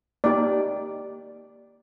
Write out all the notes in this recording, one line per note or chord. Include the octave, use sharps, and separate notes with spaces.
A#3 D#4 G4 D5